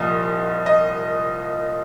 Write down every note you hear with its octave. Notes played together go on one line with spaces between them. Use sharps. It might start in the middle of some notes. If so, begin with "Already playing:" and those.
Already playing: C2 A#2 F3 D#5
D#5